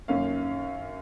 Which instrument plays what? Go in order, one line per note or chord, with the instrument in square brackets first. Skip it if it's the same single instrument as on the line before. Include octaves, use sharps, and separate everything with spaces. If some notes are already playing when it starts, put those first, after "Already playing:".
[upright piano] F#2 D#3 A#3 C#4 F5